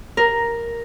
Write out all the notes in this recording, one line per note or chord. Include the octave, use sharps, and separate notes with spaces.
A#4